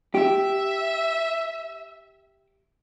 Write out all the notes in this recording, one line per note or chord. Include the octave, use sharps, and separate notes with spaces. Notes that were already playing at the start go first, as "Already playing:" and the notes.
G4 E5